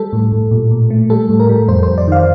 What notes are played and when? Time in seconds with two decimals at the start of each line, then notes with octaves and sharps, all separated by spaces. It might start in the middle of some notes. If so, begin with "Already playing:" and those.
Already playing: G3 A4
0.13 A2
0.32 A2
0.51 A#2
0.71 A#2
0.90 A3
1.10 G3 A4
1.29 A2
1.40 A#4
1.49 G3
1.68 F2 C5
1.83 F2 C5
1.98 D5
2.08 D#3 F5